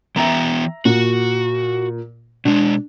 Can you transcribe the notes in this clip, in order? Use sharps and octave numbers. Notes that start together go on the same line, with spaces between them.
E3 B3 E5 G5 A#5
A#2 F#4
B2 G#3 D4